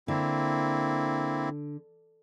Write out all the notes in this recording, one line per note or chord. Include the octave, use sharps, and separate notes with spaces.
D3 A#3 C4 E4